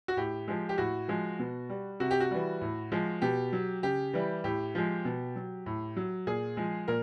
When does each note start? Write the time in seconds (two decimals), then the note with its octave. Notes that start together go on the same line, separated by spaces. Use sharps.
0.08 F#4
0.17 A2 G4
0.48 F3 G#3
0.69 G4
0.78 A2 F#4
1.08 F3 G#3
1.39 B2
1.70 G3
2.00 C3 F#4
2.11 G4
2.20 F#4
2.31 E3 G3
2.61 A2
2.92 F3 G#3
3.22 B2 G4
3.53 F#3
3.83 C#3 G4
4.13 E3 G3
4.44 A2 G4
4.75 F3 G#3
5.05 B2
5.36 F#3
5.66 A2
5.97 F#3
6.27 A#2 G#4
6.57 F3 G#3
6.88 A#2 A#4